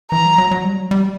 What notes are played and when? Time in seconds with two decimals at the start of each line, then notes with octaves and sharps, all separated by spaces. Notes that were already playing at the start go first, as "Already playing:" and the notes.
0.11 E3 A#5
0.25 F#3
0.38 F#3
0.51 F#3
0.64 G3
0.77 F#3
0.91 G3